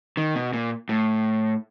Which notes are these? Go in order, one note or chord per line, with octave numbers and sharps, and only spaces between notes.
D#3
B2
A#2
A2